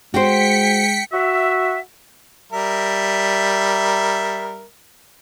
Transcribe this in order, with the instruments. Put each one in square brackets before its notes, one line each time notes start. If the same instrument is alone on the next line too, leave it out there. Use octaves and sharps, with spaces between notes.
[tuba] G#3 [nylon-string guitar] F#4 C5 [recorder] G5 [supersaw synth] B6 C#7
[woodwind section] F#4 E5
[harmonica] G3 A#4 E5